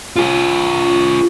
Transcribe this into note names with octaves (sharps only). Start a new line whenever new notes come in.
F4 G#4